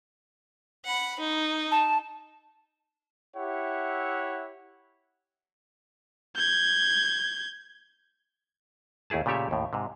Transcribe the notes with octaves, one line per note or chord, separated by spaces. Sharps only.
F#5 B5
D#4
A5
E4 G4 C#5 E5 F#5
G6 G#6
D#2 A3 E4 G#4 A5
A#2 C#3 A3 G4 C#5 E5
D#2 A2
G#2 C3